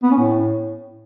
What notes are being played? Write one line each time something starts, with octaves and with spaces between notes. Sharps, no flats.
B3
C#4
A2